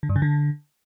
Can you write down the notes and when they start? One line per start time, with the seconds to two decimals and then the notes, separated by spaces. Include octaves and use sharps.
0.03 D3
0.09 G2
0.16 C#3
0.22 D3